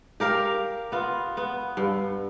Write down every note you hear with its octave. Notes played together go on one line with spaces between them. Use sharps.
G4 A#4 F5
B3 F4
B3
G2